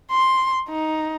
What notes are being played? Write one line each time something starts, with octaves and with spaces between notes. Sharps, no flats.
C6
D#4